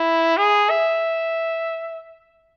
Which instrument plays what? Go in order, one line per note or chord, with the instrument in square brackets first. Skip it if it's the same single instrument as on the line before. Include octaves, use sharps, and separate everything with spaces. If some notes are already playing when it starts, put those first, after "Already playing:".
Already playing: [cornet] E4
G#4
E5